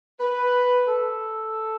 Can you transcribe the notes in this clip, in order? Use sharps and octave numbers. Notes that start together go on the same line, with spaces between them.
B4
A4